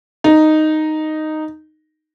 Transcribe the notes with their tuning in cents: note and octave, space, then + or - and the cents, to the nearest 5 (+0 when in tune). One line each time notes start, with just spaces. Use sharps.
D#4 -5